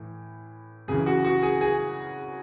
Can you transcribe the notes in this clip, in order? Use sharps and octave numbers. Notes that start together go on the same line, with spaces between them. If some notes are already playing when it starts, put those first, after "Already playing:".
Already playing: A2 E3
F#2 C#3 E3 G#4
F#4
F#4
G#4
G#4